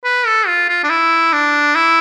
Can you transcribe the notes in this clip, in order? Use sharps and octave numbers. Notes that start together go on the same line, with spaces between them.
B4
A4
F4
F4
D4
E4
D4
E4